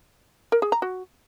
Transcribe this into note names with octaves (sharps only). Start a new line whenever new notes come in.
A#4
G#4
A#5
F#4